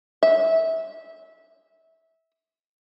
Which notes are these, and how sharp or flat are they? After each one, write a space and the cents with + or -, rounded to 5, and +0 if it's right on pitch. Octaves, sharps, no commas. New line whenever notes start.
E5 -20